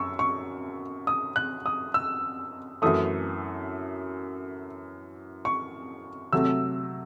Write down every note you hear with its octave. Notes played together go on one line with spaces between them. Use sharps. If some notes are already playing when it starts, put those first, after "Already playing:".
Already playing: F#2 C#6 E6
C#6
D#6
F#6
D#6
E6
F#2 E3 A3 D#6
C#6
C3 F#3 A3 E6